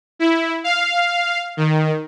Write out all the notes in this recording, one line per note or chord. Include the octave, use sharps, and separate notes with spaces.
E4
F5
D#3